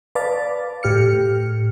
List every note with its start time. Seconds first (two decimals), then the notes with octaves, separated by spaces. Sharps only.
0.15 B4 D5 F5 A5 D6 A6
0.83 A2 G4 F6 C#7